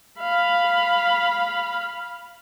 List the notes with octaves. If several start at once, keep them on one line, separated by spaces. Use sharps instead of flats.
F5 B5